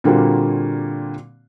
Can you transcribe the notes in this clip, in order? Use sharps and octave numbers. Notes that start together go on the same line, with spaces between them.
A#2 D3 G3 A#3 C4 F#4